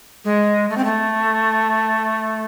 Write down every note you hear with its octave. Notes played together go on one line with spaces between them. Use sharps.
G#3
A3
C4
A3